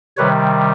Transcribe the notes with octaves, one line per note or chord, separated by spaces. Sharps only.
C3 D#3 G3 B4 C#5